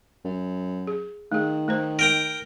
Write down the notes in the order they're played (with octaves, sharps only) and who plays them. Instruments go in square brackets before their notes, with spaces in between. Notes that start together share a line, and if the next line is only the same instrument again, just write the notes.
[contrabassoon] F#2
[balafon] G#4
[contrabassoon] D#3 [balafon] A3 G#4
[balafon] A3 D#4 C5
[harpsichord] A#4 G5 A#5